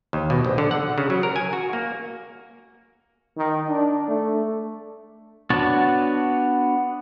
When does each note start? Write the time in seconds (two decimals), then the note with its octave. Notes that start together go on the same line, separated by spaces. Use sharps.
0.13 D#2
0.30 B2
0.45 A#1
0.58 D3
0.71 F#5
0.98 C#3
1.10 F#3
1.23 A#4
1.36 G#5
1.53 F#4
1.73 A#3
3.37 D#3
3.68 D4
4.08 A3
5.50 B3 D4 F#4 C#5 A5